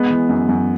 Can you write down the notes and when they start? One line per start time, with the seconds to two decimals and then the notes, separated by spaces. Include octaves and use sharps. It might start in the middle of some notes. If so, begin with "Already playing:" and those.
Already playing: G#3 B3
0.10 E3
0.29 F#2
0.49 F#2